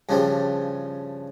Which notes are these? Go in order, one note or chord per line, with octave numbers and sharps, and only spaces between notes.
G2 C#3 F3 G3